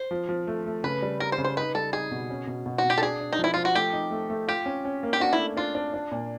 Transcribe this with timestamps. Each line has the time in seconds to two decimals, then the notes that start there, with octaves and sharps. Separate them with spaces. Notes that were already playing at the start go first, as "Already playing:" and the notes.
Already playing: C5
0.11 F3
0.29 F3
0.47 A3
0.66 A3
0.83 C#3 B4
1.02 G3
1.20 G3 A#4
1.32 C5
1.38 C#3
1.44 C5
1.57 D#4 B4
1.75 G3 A4
1.93 D#4 G#4
2.11 B2
2.30 C#4
2.47 B2
2.66 B2
2.78 F#4
2.84 B2
2.90 G4
2.98 A4
3.02 D4 G#4
3.21 D4
3.33 D#4
3.39 F3
3.44 E4
3.54 F3 F4
3.65 F#4
3.75 A3 G4
3.93 D#4
4.11 A3
4.30 A3
4.48 F4 G4
4.66 C#4
4.85 C#4
5.03 A#3
5.13 G4
5.20 D4 F#4
5.33 E4
5.39 A3
5.57 D4 F4
5.75 D4
5.94 D4
6.12 A#2